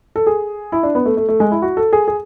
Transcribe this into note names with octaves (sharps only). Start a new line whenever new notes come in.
A4
G#4
E4
D4
B3
A3
A3
A3
G#3
E4
F#4
A4
G#4
G#4